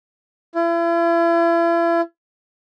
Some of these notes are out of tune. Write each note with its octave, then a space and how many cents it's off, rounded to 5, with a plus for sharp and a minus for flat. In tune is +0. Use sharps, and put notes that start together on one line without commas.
E4 +40